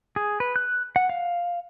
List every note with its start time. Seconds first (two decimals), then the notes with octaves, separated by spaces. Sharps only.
0.16 G#4
0.40 B4
0.56 F#6
0.96 F#5
1.09 F5